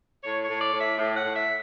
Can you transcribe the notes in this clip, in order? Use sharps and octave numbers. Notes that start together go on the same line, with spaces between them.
A2 C#5
C#5
A2
D5
A2
E5
A2
F#5
A2
E5